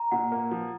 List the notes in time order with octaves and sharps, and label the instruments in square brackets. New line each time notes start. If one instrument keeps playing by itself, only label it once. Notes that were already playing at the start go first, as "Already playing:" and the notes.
Already playing: [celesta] A#5
[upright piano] A#2 [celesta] F#5
[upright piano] A#3
F3